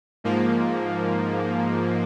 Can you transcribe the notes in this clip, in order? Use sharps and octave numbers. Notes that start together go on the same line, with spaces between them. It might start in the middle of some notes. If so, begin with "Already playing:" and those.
G#2 F3 A#3